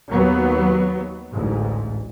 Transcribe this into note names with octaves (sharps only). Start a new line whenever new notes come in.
D#2 F#3 B3
A1 D2 G#2